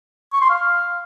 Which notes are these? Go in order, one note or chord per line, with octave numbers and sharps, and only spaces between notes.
C#6
C6
F5